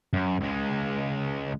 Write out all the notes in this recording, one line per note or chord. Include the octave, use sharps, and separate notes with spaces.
F#2
C#2 G#3